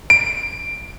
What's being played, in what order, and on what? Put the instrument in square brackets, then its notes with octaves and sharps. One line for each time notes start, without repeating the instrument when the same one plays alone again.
[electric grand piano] D7